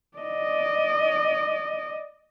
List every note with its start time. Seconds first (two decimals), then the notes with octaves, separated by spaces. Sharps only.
0.18 D5 D#5